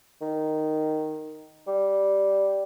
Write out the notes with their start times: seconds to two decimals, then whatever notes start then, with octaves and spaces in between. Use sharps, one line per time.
0.21 D#3
1.67 G3